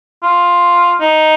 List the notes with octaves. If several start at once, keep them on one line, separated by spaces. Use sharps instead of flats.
F4
D#4